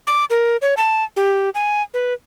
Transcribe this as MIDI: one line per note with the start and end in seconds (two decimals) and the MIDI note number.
0.07 0.25 86
0.30 0.57 70
0.62 0.75 73
0.77 1.04 81
1.16 1.50 67
1.55 1.82 80
1.94 2.13 71